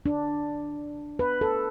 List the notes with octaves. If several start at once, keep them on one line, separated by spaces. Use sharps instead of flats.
D4
B4
A4